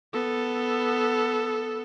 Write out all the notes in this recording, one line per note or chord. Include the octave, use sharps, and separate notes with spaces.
B3 A4